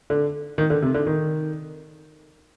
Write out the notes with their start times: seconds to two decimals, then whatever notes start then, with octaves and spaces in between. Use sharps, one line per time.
0.10 D3
0.58 D#3
0.70 D3
0.82 C3
0.94 D3
1.07 D#3